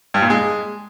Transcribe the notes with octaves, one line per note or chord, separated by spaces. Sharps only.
G2
A#2
G#3